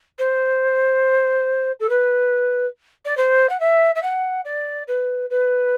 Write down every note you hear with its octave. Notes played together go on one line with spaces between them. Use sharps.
C5
A4
B4
D5
C5
F#5
E5
E5
F#5
D5
B4
B4